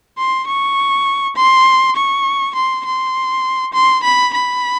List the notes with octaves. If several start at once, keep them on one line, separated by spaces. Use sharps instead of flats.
C6
C#6
C6
C#6
C6
C6
C6
B5
B5